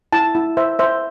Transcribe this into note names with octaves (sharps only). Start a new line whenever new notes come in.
E4 A5
E4
C5 E5
C5 E5